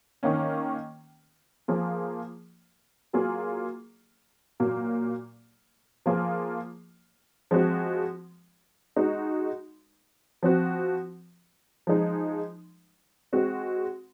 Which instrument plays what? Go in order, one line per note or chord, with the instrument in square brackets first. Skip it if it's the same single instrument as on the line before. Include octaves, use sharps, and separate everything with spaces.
[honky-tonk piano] D#3 A#3 C#4
F3 A#3 F4 G#4
F#3 A#3 F4 G#4
A#2 F#3 A#3
F3 A#3 F4 G#4
F3 G#3 C4 F#4
G#3 D#4 F#4
F3 C4 F#4
F3 G#3 D#4
G#3 C4 F#4